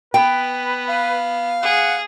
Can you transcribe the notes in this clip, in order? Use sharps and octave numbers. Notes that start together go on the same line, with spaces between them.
B3 B4 G5
F5
G#4 F#5